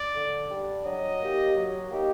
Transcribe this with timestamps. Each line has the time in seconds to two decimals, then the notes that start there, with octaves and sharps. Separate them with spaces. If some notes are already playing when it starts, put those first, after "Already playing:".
Already playing: D5
0.15 D3
0.50 G3 D4
0.85 F#3 D#5
1.21 A#3 D#4 G4
1.56 F#3
1.90 A#3 D#4 G4